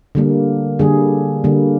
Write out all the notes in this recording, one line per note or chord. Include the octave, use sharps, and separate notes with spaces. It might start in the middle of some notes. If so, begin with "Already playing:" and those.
D3 G3 A#3
D3 G3 A#3 G#4
D3 G3 A#3